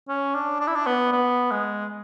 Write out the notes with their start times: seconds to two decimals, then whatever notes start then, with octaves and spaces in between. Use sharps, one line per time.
0.09 C#4
0.35 D4
0.60 D4
0.67 E4
0.75 D4
0.87 B3
1.12 B3
1.51 G#3